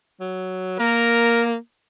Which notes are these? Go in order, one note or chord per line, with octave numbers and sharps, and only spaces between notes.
F#3
A#3 A#4